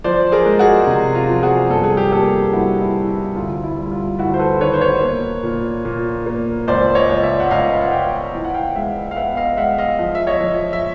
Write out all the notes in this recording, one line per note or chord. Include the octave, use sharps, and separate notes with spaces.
F3 C5 D5
G#4 A#4
G#3
F#4 G#4
C3
F4
F3
F#4 G#4
G2 A4
G#4
G4 A4
A#3 G4 A4
G2 E4 F#4
E4
E3
E4
D2 F4
E4
G3
F4
D2 E4 F#4
C5
A4 B4
D#3 B4 C#5
C5
B4 C#5
A#3
A#2
A#2
A#3
C#2 C5 D5
C#5 D#5
C#2
D5 E5
F#5
C#2 D#5 F5
F#5
C#2 F5 G5
E3
F#5
F5 G5
G#3 E5 F#5
F5
B3 E5 F#5
D#5 F5
G#3 E5 F#5
D#5 F5
F3
E5
C#5 D#5
F3
E5